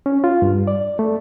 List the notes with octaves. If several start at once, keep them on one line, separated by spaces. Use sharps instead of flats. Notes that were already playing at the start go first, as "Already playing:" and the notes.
C#4
F4
G2
D5
A3